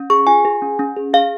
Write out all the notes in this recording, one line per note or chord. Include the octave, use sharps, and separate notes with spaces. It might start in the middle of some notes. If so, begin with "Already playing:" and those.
Already playing: C#4
G#4 C#6
F4 G#5
G#4
C#4
C#4
G#4
G#4 F5